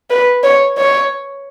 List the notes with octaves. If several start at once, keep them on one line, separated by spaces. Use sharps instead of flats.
B4
C#5
C#5